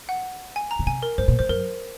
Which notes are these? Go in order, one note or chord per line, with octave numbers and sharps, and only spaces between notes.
F#5
G#5
A#5
C#3
C3 G#5
A#4
G#2 C5
A#2
G#2 C5
F#2 A#4